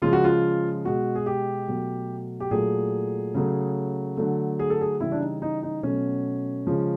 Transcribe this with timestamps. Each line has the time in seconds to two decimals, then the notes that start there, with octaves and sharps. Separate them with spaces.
0.02 C#3 F3 G#3 F4
0.13 F#4
0.24 F4
0.85 B2 G#3 F#4
1.15 G#4
1.26 G4
1.68 B2 F#3 A3
2.40 G4
2.51 A#2 F#3 A3 G#4
3.34 C#3 F#3 A3
4.17 D3 F#3 A3
4.59 G#4
4.70 A4
4.81 G#4
5.00 C#3 E3 G3 E4
5.12 D4
5.21 D#4
5.42 D#4
5.63 D#4
5.83 B2 F#3 A3 C#4
6.67 C#3 F3 G#3